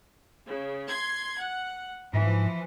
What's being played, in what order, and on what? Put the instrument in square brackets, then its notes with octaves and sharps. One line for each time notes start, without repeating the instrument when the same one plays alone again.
[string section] C#3
C6 G#6
F#5
[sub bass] G#2 [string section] E3 F3